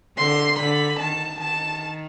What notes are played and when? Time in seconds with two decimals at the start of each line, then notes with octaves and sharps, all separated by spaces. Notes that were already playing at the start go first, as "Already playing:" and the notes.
0.17 D3 C6
0.58 D3 B5
0.99 D#3 A5
1.40 D#3 A5